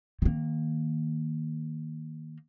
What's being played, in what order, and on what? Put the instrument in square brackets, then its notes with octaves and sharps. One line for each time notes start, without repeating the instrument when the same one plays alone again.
[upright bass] D#3 A#3